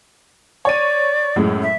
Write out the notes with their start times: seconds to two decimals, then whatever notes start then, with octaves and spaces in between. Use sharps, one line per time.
0.65 C#5 D5 D#7
1.36 F#2 A2 G#3
1.63 E5